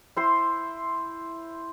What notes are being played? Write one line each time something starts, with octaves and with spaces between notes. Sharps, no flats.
E4 C5 C6